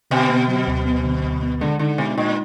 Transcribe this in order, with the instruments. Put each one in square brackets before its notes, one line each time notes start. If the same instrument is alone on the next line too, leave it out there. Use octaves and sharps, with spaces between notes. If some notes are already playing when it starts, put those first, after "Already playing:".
[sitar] B2 [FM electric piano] D3
[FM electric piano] B3
F#3
D2
B3
D3
D2
B3
[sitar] D3 [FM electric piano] G#3
[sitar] D3 [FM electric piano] D#4
[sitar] B2 [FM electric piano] G#3
[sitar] A#2 [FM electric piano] D#4